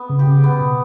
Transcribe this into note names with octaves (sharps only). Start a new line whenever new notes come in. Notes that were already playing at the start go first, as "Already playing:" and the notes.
Already playing: B3
C#3
G4
C#3
B3
B2